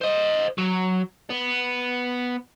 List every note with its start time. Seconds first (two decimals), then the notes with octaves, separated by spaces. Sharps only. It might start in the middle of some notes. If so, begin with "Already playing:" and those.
0.01 C5 D#5
0.58 F#3
1.30 B3